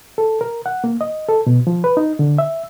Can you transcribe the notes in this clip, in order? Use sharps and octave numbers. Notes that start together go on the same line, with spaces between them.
A4
A#4
F#5
A#3
D#5
A4
B2
F3
B4
D#4
D3
E5